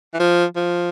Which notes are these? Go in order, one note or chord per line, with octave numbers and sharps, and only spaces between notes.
E3
F3
F3